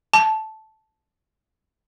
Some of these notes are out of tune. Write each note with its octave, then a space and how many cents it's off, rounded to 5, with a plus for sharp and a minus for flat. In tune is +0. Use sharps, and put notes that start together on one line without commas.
A5 -10